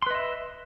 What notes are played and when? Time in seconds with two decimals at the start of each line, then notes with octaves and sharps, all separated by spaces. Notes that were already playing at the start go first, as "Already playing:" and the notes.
0.02 C6
0.07 B4
0.11 D#5
0.15 E5